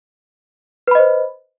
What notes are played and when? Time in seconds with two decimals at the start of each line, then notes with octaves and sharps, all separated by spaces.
0.88 B4
0.91 B5
0.95 D#5
0.99 C5